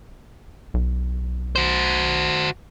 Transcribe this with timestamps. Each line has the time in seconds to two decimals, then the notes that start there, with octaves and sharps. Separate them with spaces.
0.74 B1
1.56 F#4 C5